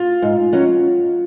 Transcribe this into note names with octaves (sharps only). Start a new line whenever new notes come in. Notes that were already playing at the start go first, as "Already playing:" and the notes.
Already playing: F4
G#2
F#3 C#4